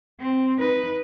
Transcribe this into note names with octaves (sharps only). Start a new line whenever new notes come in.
C4
D#4 B4